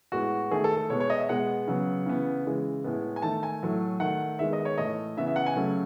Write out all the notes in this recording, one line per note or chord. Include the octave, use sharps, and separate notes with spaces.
A2 G#3 B3 F#4
D#3 A3 G#4
A4
A4
B2 G#3 B3 C#5
C#5
D#5
E5
B2 G#3 B3 F#5
C#3 F#3 B3
C#3 E3 B3
C#3 E3 G#3
A2 G#3 B3
G#5
D#3 A3 A5
G#5
A2 F#3 A3
D#3 A3 F#5
D#3 G#3 B3 E5
D#5
C#5
A2 E3 A3 D#5
C#3 E3 B3 E5
E5
F#5
G#5
C#3 F#3 A3